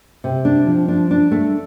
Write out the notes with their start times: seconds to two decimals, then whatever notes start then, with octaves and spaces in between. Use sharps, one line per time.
0.24 C3
0.45 D4
0.67 F3
0.88 D4
1.11 D4
1.31 A3